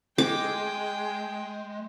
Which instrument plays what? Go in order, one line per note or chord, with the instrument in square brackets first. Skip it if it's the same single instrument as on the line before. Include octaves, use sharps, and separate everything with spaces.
[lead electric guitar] G#3 [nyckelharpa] G5 [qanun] D6